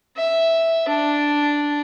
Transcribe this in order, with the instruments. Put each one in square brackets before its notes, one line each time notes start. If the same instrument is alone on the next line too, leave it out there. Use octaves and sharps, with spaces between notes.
[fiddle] E5
D4